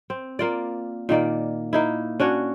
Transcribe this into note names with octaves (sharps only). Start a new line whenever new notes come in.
C4
A#3 F4 D5
A#2 D#3 A#3 D5
A#3 D#4 E4
C#4 D4 F#4 C#5